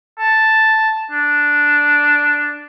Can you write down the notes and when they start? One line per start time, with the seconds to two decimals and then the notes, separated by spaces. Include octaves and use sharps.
0.20 A5
1.11 D4